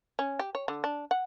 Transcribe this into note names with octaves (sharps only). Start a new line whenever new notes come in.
C#4
G4
C#5
D3
D4
F#5